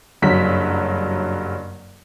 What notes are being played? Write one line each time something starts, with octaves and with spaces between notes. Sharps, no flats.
F#1 G2 F#3 B6